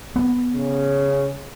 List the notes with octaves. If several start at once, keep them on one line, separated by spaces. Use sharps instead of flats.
B3
C#3 C#4